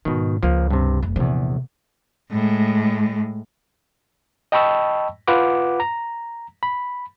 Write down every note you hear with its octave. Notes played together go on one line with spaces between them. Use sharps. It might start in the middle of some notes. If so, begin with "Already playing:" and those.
G#2 B2 D#3
C#2 F3 A#3
G2 C3
F1
A#1 E2 C3
A2 G#3
D#5 G5 A5 B5 C#6 E6
F4 B4 F#5 B5 D6
A#5
B5